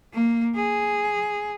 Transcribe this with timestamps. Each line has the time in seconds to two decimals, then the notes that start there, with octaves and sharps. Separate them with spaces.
0.14 A#3
0.56 G#4